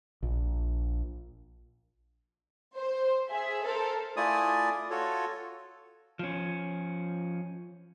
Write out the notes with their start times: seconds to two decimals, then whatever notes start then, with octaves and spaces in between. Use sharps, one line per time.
0.23 A#1
2.75 C5
3.29 G#4 E5
3.63 A4 A#4 C5
4.17 A3 E4 F4 D5 G#5 D#6
4.91 F4 F#4 A4 C#5
6.19 F3 C#4